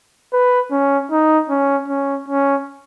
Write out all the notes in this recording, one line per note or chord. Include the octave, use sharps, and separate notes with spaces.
B4
C#4
D#4
C#4
C#4
C#4